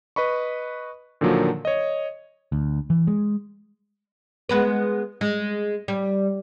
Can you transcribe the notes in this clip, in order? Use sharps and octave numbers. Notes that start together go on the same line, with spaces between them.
B4 D#5 B5 C#6
A#2 D3 D#3 F3 F#3 A#3
C#5 D#5
D2
E3
G#3
G#3 B3 B4
G#3
G3